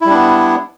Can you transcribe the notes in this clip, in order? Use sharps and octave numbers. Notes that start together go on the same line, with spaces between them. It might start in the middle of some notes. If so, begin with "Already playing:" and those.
G3 B3 D4 E4